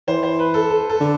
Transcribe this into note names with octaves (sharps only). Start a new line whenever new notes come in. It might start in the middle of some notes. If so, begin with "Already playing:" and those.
E3 C5
C5
B4
A4
A4
A4
D3